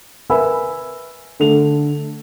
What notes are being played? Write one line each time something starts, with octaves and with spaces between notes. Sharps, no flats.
A#4 B4 E5 G#5 B5 E6
D3 A3 F7